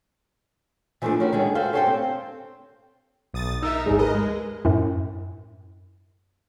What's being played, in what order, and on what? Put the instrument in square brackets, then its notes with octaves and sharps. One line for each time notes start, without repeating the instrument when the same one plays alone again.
[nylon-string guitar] E3 F3 G#3 A3 B3 D4
C#4 E4 F#4 G4 A#4
D3 D#3 G#3
F#4 A4 C5 E5 F5
C#4 G4 A4 C5 E5 G5
C4
[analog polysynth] B1 D#6 A6
[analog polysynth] D#4 A#4 E5 [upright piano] E6
[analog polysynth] G#1 D2 G#2 [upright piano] G#3 D#4 G#4
[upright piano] A#4 B4 [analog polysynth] D#5
[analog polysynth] G#3
[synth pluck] F#2 A2